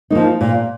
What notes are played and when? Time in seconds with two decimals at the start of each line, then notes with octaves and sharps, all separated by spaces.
0.10 F3 A#3 D#4
0.41 A#2